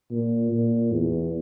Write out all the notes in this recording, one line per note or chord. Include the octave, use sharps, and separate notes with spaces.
A#2
A#2
E2